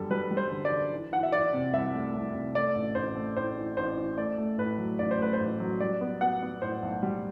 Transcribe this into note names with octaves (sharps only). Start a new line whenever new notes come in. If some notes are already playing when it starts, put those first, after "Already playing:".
Already playing: G1 F#2 D3 G3 A4
G3 B4
G3
C5
D3
D5
D3
E3
E3 F#5
E5
E3 D5
C3
C2 E5
A3
C2
C3
A3 D5
A1
A1 C5
A3
A2 C5
E3
A1 C5
E3
A3 D5
A3
A2 B4
F#3
A1 D5
C5
A3 B4
C5
A1
F#3
G3 D5
B3
B3 F#5
B3
A2 C5
B1
G3